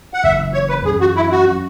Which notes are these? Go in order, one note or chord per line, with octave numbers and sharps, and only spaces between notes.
F#5
F#1 F#2 E3 E5
C#5
B4
F#2 E3 C#4 G#4
F#4
E4
F#4
F#3 C#4